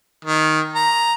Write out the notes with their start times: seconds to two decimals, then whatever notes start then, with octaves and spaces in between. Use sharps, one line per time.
0.25 D#3
0.75 A#5